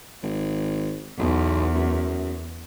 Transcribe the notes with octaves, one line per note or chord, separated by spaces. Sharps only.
G#1
B1 E2
F#2